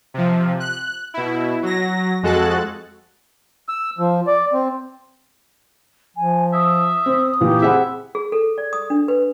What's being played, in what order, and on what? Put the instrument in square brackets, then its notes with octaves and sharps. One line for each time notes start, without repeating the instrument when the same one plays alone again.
[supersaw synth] C3 F3
F#6
B2 E4
F#3 A#6
F2 G#3 F#4 A4 F#6 A6
[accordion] E6
F3
D5
C4
[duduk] F3 [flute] G#5
[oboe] E5 [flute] D#6
[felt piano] C4
[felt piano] A#2 E3 [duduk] G4
[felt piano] C4 F#5 B5 [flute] G#4 [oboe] E5
[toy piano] G#4
A4
D5
D#6
D4
B4